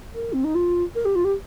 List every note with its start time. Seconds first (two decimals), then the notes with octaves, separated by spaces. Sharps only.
0.14 A#4
0.33 C4
0.44 D#4
0.55 F4
0.95 A#4
1.05 G4
1.15 F4
1.24 G4